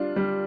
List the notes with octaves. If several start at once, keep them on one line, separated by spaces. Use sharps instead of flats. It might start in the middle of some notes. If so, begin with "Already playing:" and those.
Already playing: G3 D4 F4
G3